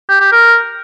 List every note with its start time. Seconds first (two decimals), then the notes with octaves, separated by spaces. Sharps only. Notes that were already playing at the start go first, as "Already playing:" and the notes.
0.09 G4
0.20 G4
0.32 A#4